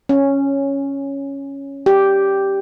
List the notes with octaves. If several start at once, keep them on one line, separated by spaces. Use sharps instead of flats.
C#4
G4